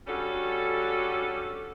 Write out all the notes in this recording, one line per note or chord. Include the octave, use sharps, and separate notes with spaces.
G3 C#4 D4 F#4 A4